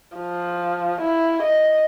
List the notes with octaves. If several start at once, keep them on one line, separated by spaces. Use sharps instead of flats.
F3
E4
D#5